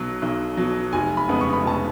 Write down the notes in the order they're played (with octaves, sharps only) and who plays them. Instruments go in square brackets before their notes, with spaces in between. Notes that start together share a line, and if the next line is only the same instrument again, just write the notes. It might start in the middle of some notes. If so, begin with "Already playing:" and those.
Already playing: [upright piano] B1 B2 F#3
B1
B2 F#3
F1 G#5
B5
F2 C#3 G#3 B3
C#6
B5
F1 A5